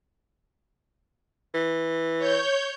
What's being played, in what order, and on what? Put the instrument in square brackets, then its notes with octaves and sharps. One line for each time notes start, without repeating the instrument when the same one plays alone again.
[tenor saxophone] E3
[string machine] C#5 G6